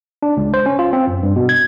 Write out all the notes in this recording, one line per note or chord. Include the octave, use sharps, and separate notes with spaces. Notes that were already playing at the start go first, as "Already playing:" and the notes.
D4
C#2
C5
C#4
F4
C4
F#2
G2
B2
G#6